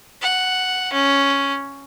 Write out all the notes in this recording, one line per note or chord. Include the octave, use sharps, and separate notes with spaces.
F#5
C#4